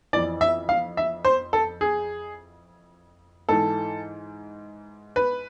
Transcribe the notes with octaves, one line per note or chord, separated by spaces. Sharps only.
F2 E3 D5
E5
F5
E5
C5
A4
G#4
G#2 E3 A4
B4